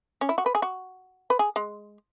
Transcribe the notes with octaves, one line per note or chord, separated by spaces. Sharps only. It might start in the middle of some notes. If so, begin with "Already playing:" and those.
C#4
E4
F#4
B4
G#4
F#4
B4
G#4
G#3